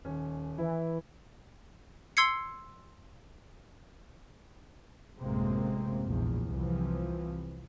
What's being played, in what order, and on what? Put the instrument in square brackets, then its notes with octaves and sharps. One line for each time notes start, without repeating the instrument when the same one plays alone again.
[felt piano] D#1 C#4
[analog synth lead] E3 [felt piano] E4
[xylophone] C6 E6 G#6 C7 C#7
[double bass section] A1 F#2 C3 G#3 A#3 C4
A#1 E2
C2 C3 E3 F3